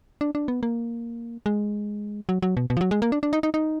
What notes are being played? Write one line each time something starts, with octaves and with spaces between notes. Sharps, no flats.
D4
D4
B3
A#3
G#3
F#3
F#3
B2
B2
F3
F#3
G#3
A#3
D4
D4
D#4
D#4
D#4